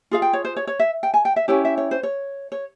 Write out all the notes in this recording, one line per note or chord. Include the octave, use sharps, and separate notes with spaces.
F4 G#4 F5
G5
C#5
C5
C#5
C#5
E5
G5
G#5
G5
E5
C#4 E4 G4 C#5
E5
C#5
C5
C#5
C#5